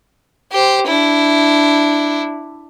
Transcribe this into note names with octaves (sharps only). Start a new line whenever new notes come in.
G4 C5
D4 E4